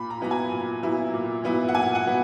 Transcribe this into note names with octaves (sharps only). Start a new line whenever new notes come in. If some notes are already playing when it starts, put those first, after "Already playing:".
Already playing: A#2 B5
A#5
F#3 B3 E4 A#5
G#5
A#2
F#3 B3 E4
A#2
F#3 B3 E4
F#5
A#2 G#5
F#5
F#3 B3